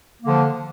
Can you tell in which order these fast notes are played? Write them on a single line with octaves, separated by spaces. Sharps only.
A#3 D3 F3